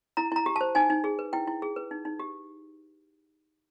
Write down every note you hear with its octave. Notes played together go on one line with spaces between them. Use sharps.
E4 A#5
E4 A#5
G4
C5 A5
D#4 G#5
D#4
G#4
B4
E4 G5
E4
G#4
B4
D#4
D#4
G4